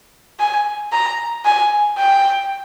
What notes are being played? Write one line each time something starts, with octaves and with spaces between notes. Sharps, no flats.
G#5
A#5
G#5
G5